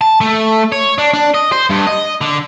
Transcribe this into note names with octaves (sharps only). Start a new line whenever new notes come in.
A5
A3
C#5
D4
D4
D#5
C5
G2
D#5
D3